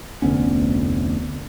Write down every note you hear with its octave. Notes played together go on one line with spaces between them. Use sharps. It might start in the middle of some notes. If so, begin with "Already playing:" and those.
F1 D2 B3 C#4